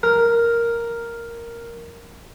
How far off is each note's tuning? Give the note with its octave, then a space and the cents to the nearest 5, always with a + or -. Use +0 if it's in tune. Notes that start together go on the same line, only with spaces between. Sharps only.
A#4 +0